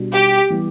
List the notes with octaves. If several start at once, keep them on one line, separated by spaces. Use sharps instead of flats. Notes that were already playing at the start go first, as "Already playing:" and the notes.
Already playing: B2 G3 D4 F#4
G4
E3 G3 B3